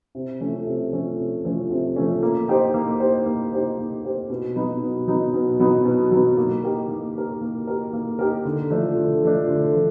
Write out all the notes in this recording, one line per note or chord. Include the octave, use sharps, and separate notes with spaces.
C3
F3 A3 C#4
C3
F3 A3 C#4
C3
F3 A3 C#4
C3
F3 A3 C#4
A#3
D#4 G4 C5
A#3
D#4 G4 C5
A#3
D#4 G4 C5
A#3
D#4 G4 C5
B2
F#3 B3 D#4
B2
F#3 B3 D#4
B2
F#3 B3 D#4
B2
F#3 B3 D#4
A#3
D#4 G4 A#4
A#3
D#4 G4 A#4
A#3
D#4 G4 A#4
A#3
D#4 G4 A#4
D3
F3 A3 D4
D3
F3 A3 D4
D3
F3